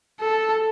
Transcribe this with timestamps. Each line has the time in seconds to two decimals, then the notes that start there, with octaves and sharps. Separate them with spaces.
0.20 A4